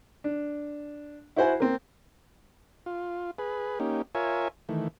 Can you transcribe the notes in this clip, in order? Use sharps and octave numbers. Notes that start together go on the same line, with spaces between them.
D4
E4 F#4 C5 F#5 G#5
A#3 C4
F4
G#4 B4
A#3 C#4 D#4 G4
F4 A#4 C#5 E5 G#5
D#3 E3 A3